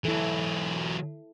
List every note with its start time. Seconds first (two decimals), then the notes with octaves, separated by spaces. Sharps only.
0.05 E3 F#3 E4 A4